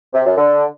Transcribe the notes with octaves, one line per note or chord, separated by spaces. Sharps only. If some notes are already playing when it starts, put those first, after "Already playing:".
C3
F#2
D3